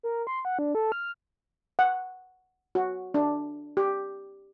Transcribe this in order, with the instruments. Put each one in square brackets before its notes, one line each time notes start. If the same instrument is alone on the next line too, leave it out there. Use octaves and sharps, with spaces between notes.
[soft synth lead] A#4
C6
F#5
D4
A4
F6
[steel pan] F#5
F#4
D4
G4